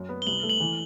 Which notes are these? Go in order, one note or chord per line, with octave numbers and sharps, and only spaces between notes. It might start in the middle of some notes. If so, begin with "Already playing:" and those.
Already playing: F#2 F#4
B3
G7
C2 F#7
A3
F#7
E3